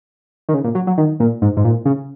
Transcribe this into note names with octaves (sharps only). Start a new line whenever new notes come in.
D#3
C#3
A#2
F#3
F#3
D#3
A#2
G#2
G#2
A#2
C#3